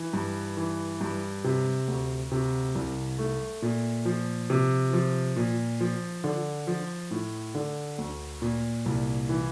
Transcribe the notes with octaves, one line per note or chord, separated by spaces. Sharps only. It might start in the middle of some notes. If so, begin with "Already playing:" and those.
Already playing: E3
G2
E3
G2
C3
D2
C3
C2
A3
A#2
F3
C3
F3
A#2
F3
D3
F3
A2
D3
D2
A#2
C2
E3